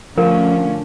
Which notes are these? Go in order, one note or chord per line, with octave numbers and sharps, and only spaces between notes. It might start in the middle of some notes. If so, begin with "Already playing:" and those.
D3 F3 A3 C#4 F4 A#4